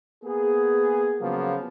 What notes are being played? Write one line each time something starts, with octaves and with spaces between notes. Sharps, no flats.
A#3 B3 G#4
C#3 F3 F#3 A#3 B3